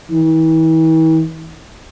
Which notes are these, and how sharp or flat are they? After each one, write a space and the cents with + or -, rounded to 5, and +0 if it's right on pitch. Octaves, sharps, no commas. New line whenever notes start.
E3 -45